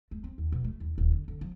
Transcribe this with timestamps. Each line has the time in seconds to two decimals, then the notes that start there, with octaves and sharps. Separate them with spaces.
0.11 A3
0.24 C4
0.38 D#2
0.52 B2
0.64 A3
0.80 D#2
0.98 D#1
1.11 D3
1.28 D3
1.41 F3